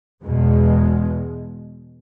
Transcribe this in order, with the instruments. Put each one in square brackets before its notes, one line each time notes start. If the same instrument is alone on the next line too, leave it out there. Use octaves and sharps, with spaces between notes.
[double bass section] E2 B2 G#3